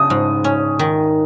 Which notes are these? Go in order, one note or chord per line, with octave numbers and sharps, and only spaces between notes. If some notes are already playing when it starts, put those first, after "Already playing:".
Already playing: C#3 D#6
G#2
C#4
D#3